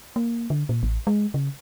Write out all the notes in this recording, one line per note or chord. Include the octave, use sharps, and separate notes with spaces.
A#3
D3
A#2
A1
G#3
C#3